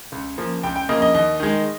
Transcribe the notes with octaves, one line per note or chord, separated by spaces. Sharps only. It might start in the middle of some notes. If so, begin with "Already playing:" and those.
C#2
C#3 F3 A#3
C#2 G5
G5
C#3 F3 A#3 D#5
D#5
D#2 D#5
D#3 G#3